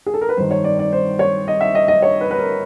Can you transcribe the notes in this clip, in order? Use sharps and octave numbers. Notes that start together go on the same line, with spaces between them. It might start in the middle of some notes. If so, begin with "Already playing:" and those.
G#4
A4
A#4
B4
G2 D#3 C5
C#5
D5
D5
C5
C#5
D#5
E5
D#5
D#5
C#5
B4
B4
A#4